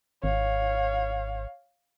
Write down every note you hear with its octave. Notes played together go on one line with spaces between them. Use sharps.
G#1 C#5 F5